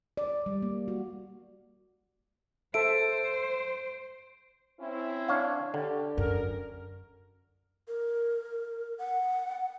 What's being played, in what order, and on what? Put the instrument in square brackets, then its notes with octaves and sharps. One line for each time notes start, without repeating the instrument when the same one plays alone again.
[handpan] D5
G3
A#3
F#4
[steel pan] A4 E5 [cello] C5 [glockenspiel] D7
[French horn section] C4 C#4 E4
[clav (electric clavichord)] D4 C#5 F5
[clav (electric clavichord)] D3 [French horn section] G4
[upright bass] F#2 [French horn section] A#4
[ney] A#4
F#5